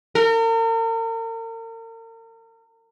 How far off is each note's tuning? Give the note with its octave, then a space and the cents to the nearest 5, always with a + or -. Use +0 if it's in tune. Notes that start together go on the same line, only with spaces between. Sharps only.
A#4 -40